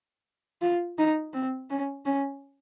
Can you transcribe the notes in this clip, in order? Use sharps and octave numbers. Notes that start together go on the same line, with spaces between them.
F4
D#4
C4
C#4
C#4